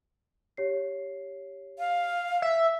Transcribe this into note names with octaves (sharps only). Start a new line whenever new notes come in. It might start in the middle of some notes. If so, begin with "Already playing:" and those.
G4 C#5 C7
F5
E5